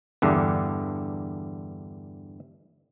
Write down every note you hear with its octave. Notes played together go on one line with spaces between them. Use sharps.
E2 G2 D3